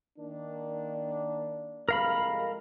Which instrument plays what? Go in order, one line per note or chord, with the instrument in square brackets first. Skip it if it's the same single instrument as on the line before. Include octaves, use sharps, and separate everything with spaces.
[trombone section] D#3 A#3 D4
[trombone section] C2 F2 G#3 [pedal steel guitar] A#4 F5 B5